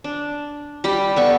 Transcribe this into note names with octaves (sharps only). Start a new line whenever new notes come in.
D4
G3 G4 B5
B3 A4 D5 C#6